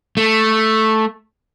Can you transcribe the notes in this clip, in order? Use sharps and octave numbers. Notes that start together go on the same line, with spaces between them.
A3